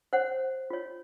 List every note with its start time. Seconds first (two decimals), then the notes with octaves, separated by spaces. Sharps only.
0.13 C5 C#5 F#5
0.70 F4 C#5